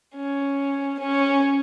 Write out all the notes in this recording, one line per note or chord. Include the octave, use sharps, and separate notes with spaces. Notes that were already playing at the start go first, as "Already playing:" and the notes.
C#4
C#4